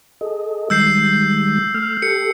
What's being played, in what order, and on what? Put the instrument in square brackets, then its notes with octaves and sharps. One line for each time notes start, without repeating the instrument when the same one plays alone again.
[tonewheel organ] G#4 A4 D#5
[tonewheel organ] D#3 G3 G#3 [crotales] E6 G6 C7
[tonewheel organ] A3 F6
[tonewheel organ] G4 A4 [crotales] C#7